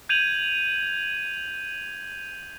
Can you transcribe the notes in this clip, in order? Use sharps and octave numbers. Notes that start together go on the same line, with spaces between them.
G6 G#6 D#7 F7 F#7